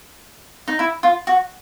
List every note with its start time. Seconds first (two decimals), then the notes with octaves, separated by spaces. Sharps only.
0.68 D#4
0.79 E4
1.03 F4
1.27 F#4